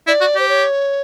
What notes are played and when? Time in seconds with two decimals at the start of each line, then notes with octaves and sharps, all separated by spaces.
0.07 E4 D5
0.21 F#4
0.35 G4 C5
0.49 C#5